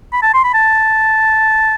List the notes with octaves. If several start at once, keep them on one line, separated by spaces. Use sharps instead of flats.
B5
A5
C6
B5
A5